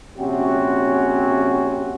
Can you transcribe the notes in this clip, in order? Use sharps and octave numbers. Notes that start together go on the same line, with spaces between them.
A#1 C3 C4 C#4 F#4